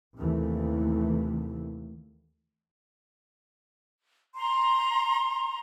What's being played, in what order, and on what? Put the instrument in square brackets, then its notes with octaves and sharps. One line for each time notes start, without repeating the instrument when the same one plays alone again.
[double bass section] D#2 C3 E3 A3
[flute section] A#5 C6